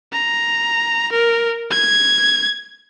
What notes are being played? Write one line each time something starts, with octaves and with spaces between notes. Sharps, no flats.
A#5
A#4
G#6